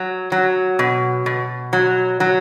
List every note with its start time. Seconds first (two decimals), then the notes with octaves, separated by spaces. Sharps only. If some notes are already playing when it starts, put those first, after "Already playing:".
Already playing: F#3
0.32 F#3
0.79 B2
1.26 B2
1.73 F#3
2.20 F#3